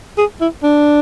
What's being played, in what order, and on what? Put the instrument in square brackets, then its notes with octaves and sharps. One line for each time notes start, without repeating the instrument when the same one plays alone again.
[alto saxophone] G#4
E4
D4